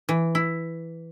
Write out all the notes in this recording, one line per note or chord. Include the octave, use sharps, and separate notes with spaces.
E3
E4